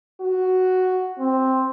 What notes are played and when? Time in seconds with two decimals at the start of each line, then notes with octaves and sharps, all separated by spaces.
0.21 F#4
1.19 C4